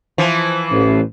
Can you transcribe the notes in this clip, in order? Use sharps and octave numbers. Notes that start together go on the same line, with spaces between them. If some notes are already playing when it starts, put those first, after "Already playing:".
E3 F3
A1